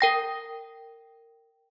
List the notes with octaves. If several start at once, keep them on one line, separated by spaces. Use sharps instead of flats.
A#4 G5 A#6